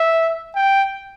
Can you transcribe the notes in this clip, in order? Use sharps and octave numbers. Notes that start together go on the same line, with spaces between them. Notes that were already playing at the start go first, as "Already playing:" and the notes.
Already playing: E5
G5